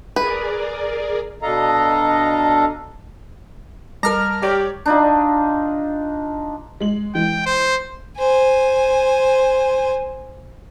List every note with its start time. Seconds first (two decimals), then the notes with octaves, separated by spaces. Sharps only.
0.16 G#4 A#4 B4 D5
1.42 B2 D4 A4 D#5 F5 A#5
4.03 G3 A#4 A5 A#5 F6
4.42 G4 C#5 D5 D7
4.86 D4 D#4 F4
6.80 G#3 F#7
7.15 E3 G#3 G5
7.46 C5
8.18 C5 G#5